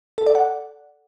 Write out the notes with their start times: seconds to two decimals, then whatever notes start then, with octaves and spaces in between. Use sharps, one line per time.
0.18 A4
0.26 D5
0.35 F#5